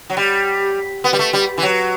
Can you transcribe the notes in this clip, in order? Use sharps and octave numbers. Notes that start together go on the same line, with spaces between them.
F#3
G3
B3
G3
A3
G3
E3
F#3